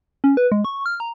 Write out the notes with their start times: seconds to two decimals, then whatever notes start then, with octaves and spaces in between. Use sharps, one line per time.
0.24 C#4
0.37 B4
0.52 G#3
0.65 C#6
0.86 F6
1.00 A#5